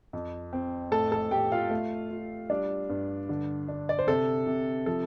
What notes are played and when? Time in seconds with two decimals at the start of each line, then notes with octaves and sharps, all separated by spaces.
0.13 F2
0.53 C4
0.91 A2 A4 A5
1.12 A4 A5
1.31 A2 G4 G5
1.52 F4 F5
1.70 A3
2.10 F4
2.49 G3 D4 D5
2.90 G2
3.29 D3
3.68 D4
3.89 D5
3.99 C5
4.07 C3 A4
4.47 C3
4.86 F3 A4